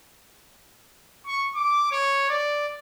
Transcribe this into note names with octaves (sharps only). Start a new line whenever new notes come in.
C#6
D6
C#5
D5